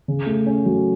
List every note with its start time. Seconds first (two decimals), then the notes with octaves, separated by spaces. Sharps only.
0.08 C#3
0.26 A3
0.46 C#4
0.65 F#3